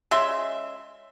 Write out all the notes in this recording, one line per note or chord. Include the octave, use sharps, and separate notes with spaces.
C#3 G#3 E5 C6